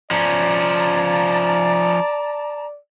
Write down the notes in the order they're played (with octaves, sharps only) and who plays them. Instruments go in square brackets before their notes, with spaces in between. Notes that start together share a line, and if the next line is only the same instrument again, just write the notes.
[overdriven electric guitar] F3 C#4 [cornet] D5 [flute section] A5 A#5